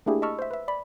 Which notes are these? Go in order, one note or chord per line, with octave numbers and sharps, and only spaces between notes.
A3 A#3 D4 E4 G4 G#4
D#5 A5 B5 C#6 E6 F6
C5 E5
B4 E5
D5 B5